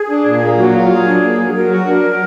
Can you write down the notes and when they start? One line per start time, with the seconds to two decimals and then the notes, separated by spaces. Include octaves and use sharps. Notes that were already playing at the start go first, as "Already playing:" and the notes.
Already playing: G#4
0.10 D4
0.26 A#2
0.42 A#3
0.57 F#3 F#4
0.75 F4
0.90 F#3 G#4
1.06 D4
1.23 A#3
1.39 F#3
1.54 F#3 A#4
1.71 F#4
1.86 D4 A#4
2.03 F#3